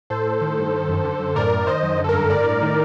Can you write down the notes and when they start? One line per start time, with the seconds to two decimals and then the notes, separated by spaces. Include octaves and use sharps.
0.10 A2 A4 C5
0.26 A2
0.41 D#3
0.58 G2
0.72 D#3
0.88 F#2
1.05 D3
1.19 F#2
1.35 A2 A#4 D5
1.52 A2
1.67 D#3 C5 D#5
1.83 F#2
1.99 D3
2.04 A4
2.09 G2 A#4
2.30 A2 A#4 D5
2.46 A2
2.62 D#3